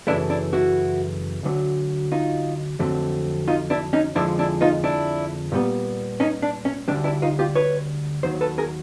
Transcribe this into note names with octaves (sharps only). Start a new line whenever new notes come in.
F#2 C#3 E3 A3 D4 E4
D4 E4
E4 F#4
D2 D3 F#3
D#4 F4
F2 D3 F#3 A3 C4
D#4 F4
D4 E4
C#4 D#4
F2 D3 F3 G#3 D4 E4
D4 E4
D#4 F4
D4 E4
A#2 G3 B3
C#4 D#4
D4
C#4
D2 D3 G3 D4
D4 E4
D#4 F4
F4 G4
B4 C#5
D#2 D#3 F#3 C5
A4 B4
G#4 A#4